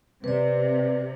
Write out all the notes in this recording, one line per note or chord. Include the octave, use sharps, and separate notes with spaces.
C3 B4 D5